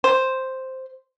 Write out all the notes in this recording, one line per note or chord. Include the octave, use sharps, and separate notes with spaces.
C5